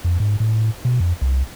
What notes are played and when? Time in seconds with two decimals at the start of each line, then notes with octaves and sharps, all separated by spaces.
0.05 F2
0.20 G#2
0.40 A2
0.85 B2
1.00 F2
1.22 C2